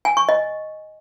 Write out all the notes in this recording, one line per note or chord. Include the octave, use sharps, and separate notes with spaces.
G#5
C#6
D#5